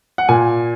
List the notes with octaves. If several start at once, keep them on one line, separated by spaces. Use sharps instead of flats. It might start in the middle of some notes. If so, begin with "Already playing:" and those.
F#5
A#2 G#5